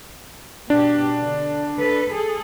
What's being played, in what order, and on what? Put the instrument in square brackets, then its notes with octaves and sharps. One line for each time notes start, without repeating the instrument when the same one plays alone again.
[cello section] B2 G4 [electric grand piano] D4
[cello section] D3
A4 B4
G#4 A4